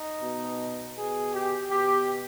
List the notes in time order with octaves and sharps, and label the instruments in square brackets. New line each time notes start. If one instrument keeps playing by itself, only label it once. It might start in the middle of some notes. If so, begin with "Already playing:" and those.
Already playing: [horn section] D#4
B2
B2 G#4
G4
B2 G4